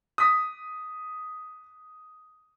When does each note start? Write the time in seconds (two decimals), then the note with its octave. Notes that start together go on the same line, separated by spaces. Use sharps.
0.18 D#6 B6